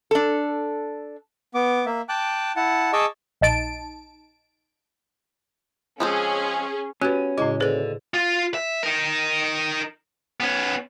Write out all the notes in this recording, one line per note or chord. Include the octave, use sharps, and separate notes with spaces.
D4 A4
B3 D6
A#3 E5
G5 A5 D6 F#6
E4 F#5 A5
G#4 D#5 A5 C#6 D6 E6
A#1 D#4 A5 D7
F3 G#3 C4 C#4 G#4
B3 C#4 F#4 G4 F#6 G#6
A2 C#3 G#3 E4
D#2 D3 G#4 B4 C5
F4
E5
D#4 A#4
B3 C#4